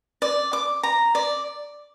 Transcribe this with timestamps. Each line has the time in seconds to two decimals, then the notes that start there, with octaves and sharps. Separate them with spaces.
0.22 D5
0.53 D6
0.83 A#5
1.15 D5